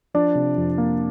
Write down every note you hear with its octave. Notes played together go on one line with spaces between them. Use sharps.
F3 D4 D5
C3
F2
A#3